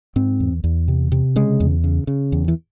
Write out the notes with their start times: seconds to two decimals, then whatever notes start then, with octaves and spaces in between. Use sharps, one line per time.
0.16 G#2 C4
0.40 E2
0.64 E2
0.88 C3
1.12 C3
1.36 C#3 G#3
1.60 E2
1.84 C#3
2.07 C#3
2.32 E2
2.48 E3